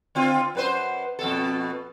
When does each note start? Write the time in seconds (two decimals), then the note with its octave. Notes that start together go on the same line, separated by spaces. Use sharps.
0.15 D3 C4 F4
0.55 F#2 B4 C5
1.19 F2 B2 A4